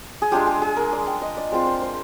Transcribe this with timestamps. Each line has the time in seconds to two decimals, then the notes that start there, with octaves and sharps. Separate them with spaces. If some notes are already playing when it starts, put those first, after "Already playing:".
0.22 G#4
0.31 G#3 D4 F4 G4
0.47 G#4
0.62 G#4
0.76 A#4
0.92 D5
1.07 G5
1.22 D#5
1.37 D5
1.52 G#3 C4 F4 D5
1.67 C5
1.82 C5